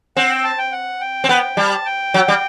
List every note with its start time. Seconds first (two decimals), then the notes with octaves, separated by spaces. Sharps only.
0.17 C4 F#5
0.30 G5
0.44 A5
0.58 G5
0.72 F#5
1.01 G5
1.24 C4
1.29 B3
1.57 G3 A5
1.86 G5
2.14 F#3
2.28 G3